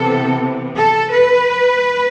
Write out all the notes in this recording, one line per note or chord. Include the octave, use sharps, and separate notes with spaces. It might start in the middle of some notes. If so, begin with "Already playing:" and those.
Already playing: C3 E3 B3 A4
A4
B4